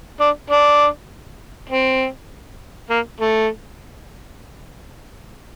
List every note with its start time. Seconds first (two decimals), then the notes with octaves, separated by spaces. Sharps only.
0.20 D4
0.50 D4
1.70 C4
2.90 A#3
3.20 A3